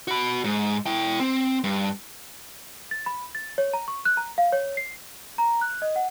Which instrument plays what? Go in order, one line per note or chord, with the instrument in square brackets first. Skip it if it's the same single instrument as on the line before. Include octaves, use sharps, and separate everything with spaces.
[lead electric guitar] F#4 B5
G#2
E4 G5
C4
G2
[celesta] A6
B5
A6
C#5
A#5
C#6
F#6
A#5
F5
C#5
C7
A#5
F#6
D#5
F#5